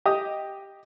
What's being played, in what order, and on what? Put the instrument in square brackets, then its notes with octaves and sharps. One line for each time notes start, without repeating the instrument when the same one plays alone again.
[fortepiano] G4 D#5 D#6